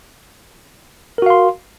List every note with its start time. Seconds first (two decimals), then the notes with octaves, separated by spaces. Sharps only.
1.18 A#4
1.22 F#4
1.26 F5
1.30 C6